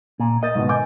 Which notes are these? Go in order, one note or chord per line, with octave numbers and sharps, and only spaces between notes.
A#2
A#4 D#5 G6 A6
G#2 B2 D#3
G#5 D6 G6